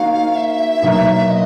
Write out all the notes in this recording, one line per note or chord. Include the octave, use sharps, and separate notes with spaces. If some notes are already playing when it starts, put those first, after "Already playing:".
Already playing: A#3 D#4 F#4 C5 F5
E5
B2 F#3 A#3 D#4
D#5